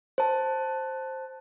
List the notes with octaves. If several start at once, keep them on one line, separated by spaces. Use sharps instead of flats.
C5 A5